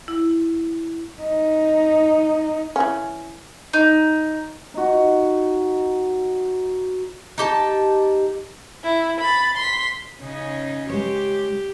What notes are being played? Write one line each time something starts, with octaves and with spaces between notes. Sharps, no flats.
E4
D#4
E3 C#4
D#4
D#4 F#4
D#4 G4 A5
E4
B5 A6
C6 B6
C#3 C#4 D#4
G#3 G4 C#5